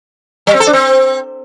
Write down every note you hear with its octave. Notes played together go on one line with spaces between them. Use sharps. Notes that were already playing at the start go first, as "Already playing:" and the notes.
G3
C4
A4
D4
C4